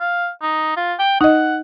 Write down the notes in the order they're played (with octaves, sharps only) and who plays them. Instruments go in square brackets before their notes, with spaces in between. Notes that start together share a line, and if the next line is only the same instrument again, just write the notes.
[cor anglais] F5
D#4
F4
G5
[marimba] D#4 D#5 [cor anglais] F#5